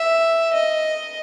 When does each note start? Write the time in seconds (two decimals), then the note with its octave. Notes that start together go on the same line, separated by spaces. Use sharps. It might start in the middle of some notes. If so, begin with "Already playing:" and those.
Already playing: E5
0.53 D#5